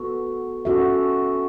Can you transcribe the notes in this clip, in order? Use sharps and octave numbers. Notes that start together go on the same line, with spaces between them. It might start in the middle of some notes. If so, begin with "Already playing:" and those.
Already playing: B3 F#4 A4
C#4 F#4 A4 E5